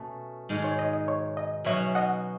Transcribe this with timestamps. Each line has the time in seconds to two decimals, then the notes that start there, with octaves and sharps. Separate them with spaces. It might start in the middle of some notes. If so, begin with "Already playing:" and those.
Already playing: B2 A3 C#4
0.49 G#2 D#3 G#3
0.64 C#5
0.79 D#5
0.93 D#5
1.08 C#5
1.37 D#5
1.65 B2 F#3 C#4 F#4 C#5 E5
1.95 D#5 F#5